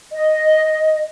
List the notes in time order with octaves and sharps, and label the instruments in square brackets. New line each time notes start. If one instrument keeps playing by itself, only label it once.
[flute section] D#5